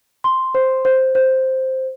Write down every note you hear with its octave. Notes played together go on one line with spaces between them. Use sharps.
C6
C5
C5
C5